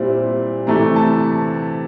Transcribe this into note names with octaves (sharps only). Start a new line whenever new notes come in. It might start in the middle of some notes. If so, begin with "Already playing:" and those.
Already playing: A#2 G3 C4 E4
C3 E3 A3 A#5
A5